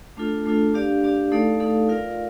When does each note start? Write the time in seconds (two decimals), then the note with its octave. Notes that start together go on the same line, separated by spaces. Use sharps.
0.17 A3 D4 F4 A4
0.46 A3 D4 F4 A4
0.74 D4 G4 D5 F5
1.03 D4 G4 D5 F5
1.32 A3 D#4 A4 D5 F5
1.60 A3 D#4 A4 D5 F5
1.89 F4 A#4 D5 F5